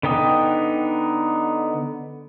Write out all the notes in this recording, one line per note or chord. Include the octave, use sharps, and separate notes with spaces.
D3 B3 D#4 G5 D#6